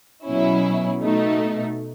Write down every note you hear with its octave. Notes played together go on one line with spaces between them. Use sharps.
B2 F#3 C#4 E4
B2 A3 D#4